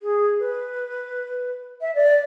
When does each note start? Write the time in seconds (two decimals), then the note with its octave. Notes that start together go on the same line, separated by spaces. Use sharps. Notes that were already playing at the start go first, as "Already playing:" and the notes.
0.01 G#4
0.39 B4
1.81 E5
1.95 D5